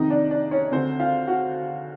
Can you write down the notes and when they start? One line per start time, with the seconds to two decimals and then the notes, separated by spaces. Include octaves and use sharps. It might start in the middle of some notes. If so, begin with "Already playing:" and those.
Already playing: F2 C3 D#3 D#4 D#5
0.10 D4 D5
0.31 D4 D5
0.51 C#4 C#5
0.72 D2 D3 C4 C5
0.99 F4 F5
1.27 F#4 F#5